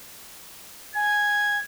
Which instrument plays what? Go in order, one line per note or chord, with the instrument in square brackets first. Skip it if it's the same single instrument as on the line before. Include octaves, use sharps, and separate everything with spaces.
[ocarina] G#5 [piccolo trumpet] G#6